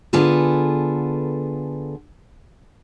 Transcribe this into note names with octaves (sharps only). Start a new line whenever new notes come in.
D3 B3 F4 G#4 A4 B4